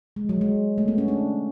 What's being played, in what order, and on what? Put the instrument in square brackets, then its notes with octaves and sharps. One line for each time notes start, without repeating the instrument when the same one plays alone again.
[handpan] G#3
F#3
G#3
A3
B3
C#4
D4